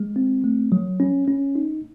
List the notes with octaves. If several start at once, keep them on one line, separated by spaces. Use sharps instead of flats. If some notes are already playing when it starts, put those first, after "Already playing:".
Already playing: G#3
C4
A3
F#3
C#4
C#4
D#4